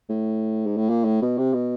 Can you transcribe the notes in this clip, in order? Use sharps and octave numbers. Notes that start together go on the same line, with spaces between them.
A2
G#2
A2
A#2
A2
B2
C3
B2